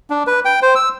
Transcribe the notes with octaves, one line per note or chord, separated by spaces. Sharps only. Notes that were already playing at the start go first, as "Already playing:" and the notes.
D4
B4
G5
C5
E6